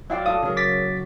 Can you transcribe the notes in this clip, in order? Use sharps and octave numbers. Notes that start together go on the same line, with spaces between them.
F#3 E4 F4 D5 F5 G5
A4 F5 A5 D#6
C#3 F#3 G#4 A#4
D6 A6 B6